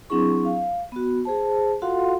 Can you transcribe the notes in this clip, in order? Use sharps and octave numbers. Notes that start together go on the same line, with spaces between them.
F#3 C4 D4 E4 G#4 C#6
F5
B3 F#4
G#4 C5 A5
F4 F#4 A4 F5 F#5 C6